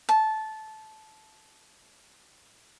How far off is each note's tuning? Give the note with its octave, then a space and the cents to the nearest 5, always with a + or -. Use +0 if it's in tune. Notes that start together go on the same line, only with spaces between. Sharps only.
A5 -15